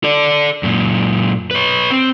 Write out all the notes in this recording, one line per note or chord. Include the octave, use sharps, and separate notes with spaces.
A4 D5
F#2 A#2
B4 C#5
C4